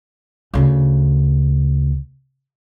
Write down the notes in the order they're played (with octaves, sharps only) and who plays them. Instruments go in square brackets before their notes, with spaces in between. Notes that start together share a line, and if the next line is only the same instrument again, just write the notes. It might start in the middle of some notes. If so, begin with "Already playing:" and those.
[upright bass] D2 C#3